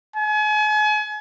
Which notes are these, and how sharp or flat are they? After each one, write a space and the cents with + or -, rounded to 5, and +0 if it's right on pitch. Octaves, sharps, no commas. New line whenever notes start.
G#5 +35